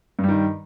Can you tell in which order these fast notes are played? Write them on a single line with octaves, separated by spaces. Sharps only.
G2 G3 D#3